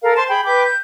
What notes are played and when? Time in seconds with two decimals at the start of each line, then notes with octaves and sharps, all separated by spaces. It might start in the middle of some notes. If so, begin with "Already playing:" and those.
0.03 A4 A#4 F5
0.16 C5 A5 C6
0.28 G#4 G5 B5
0.45 B4 G5 D6 G6
0.64 G6